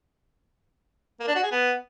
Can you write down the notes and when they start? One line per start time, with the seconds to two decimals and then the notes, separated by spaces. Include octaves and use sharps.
1.20 A#3
1.28 D4
1.36 F#4
1.43 G#4
1.51 B3